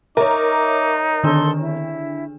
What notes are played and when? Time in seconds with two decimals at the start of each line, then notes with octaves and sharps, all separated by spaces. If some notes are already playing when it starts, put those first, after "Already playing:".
0.17 D#4 A#4 C#5 E5 A#5 D6
1.23 D3 D#3 D4 A4 C6 E6
1.60 E4